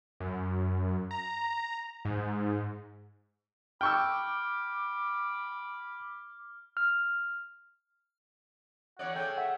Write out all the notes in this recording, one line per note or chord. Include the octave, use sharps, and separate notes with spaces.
F#2
A#5
G#2
G5 B5 C#6 D6 E6 F6
F6
E2 C#5 D5 F#5
C#3 A3 G5
E5 F#5